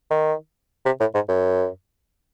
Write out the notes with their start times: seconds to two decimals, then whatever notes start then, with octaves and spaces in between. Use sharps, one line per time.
0.11 D#3
0.86 C3
1.00 A2
1.14 G#2
1.29 F#2